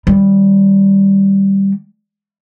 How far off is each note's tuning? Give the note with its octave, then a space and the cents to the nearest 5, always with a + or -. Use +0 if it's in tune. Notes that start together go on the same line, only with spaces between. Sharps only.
D#3 +0 G3 +0